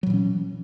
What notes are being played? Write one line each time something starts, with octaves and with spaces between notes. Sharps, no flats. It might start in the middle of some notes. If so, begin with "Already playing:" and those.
A#2 E3 F#3 C#4